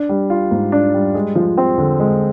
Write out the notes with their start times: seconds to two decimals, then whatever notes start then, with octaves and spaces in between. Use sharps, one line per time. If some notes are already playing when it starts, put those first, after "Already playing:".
Already playing: D4
0.09 G3
0.30 F4
0.51 G#2
0.72 D4
0.94 G3
1.15 G#3
1.35 F3
1.58 C4
1.78 D3
2.00 G#3